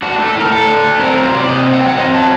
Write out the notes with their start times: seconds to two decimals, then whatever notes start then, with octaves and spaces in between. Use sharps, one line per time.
0.02 D4 F#4
0.18 A3
0.27 A4
0.34 A2
0.40 A#4
0.51 A2 A4
0.67 D4
0.84 A3
0.99 C4 A#4
1.16 F#3 A#4
1.24 C5
1.32 C3
1.37 D5
1.49 C3 D#5
1.65 C4
1.74 F#5
1.81 F#3 G5
1.88 F#5
1.97 C4 D#5
2.14 F#3 A5